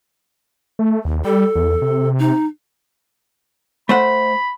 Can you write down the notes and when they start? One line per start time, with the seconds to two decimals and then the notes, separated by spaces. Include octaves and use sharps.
0.79 A3
1.05 D#2
1.25 G3 A4
1.56 E2
1.82 C3
2.19 D#4
3.89 A3 C5 F#5 B5